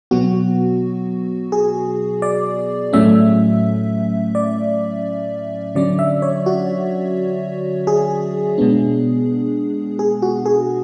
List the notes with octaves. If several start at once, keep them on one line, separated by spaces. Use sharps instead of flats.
B2 F#3 B3 F#4
G#4
D5
A2 F#3 A3 C#4 E5
D5
D3 F#3 C#4 D5
E5
C#5
F#4
G#4
B2 G#3 B3 D4
G#4
F#4
G#4